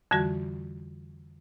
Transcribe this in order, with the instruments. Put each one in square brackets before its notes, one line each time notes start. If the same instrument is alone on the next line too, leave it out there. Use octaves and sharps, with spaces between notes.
[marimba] F2 D3 E3 G3 F#4